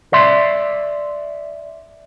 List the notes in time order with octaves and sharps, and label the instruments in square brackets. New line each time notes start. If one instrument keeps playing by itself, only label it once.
[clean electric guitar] D5 E5 C6